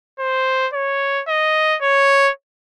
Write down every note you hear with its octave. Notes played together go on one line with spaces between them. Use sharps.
C5
C#5
D#5
C#5